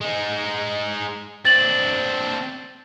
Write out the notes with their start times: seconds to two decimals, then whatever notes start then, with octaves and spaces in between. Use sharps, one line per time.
0.01 G#3 D#4
1.45 C4 D4 A6 F#7